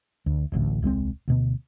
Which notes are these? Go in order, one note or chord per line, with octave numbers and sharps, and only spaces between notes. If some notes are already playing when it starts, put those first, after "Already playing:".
D2
D1 A1 D2
D#1 C2 G#3 C4
D2 B2 B3